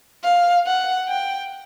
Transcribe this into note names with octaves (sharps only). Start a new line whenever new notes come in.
F5
F#5
G5